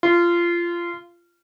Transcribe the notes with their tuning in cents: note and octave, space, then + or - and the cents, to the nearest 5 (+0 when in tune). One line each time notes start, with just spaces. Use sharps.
F4 -20